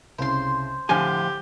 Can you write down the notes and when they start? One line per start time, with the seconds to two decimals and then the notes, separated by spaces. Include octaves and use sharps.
0.18 C2 C#3 C5 C6
0.89 A2 D3 F3 G4 G#5